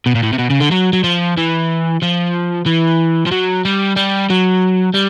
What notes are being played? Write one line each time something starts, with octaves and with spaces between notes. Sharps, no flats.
B2
A#2
A2
C3
B2
C#3
D3
F#3
F#3
F3
E3
F3
E3
F3
F#3
G3
G3
F#3
G3